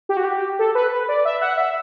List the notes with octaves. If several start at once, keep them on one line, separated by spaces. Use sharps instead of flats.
G4
F#4
G4
A4
B4
B4
D5
E5
F#5
E5